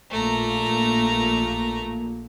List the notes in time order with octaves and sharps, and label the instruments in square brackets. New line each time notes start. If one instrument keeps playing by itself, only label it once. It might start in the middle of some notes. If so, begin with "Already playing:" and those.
[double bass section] A#1 A#2 A#3 [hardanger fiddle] A3 A#5